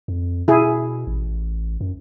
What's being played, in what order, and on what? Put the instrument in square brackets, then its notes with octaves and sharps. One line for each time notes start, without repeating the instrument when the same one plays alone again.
[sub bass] F2
[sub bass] B2 [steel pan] E4 G#4
[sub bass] A1
F#2